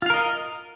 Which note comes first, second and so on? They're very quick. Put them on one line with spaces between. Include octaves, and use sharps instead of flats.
F4 F5 A#4 D#5